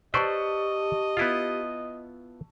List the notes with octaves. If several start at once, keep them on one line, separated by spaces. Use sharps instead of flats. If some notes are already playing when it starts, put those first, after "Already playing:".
G4 B4 C5 D5 D#5 A5 C#6 E6
B3 E4 F4